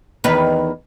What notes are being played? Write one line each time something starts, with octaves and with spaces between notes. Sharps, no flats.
E2 D#3 B4